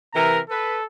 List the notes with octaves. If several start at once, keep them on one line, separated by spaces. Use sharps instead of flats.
C3 E3 A#4 A#5
A4 B4